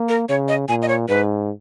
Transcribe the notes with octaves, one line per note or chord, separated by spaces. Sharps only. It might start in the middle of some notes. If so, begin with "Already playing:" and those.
Already playing: A#3
A#4
C#3 C#5
D#5
A#2 G#5
D#5
C#5
G#2 B4